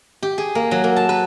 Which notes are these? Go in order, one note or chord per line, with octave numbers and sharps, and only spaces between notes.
G4
G#4
A#3
F#3
A#3
A5
B4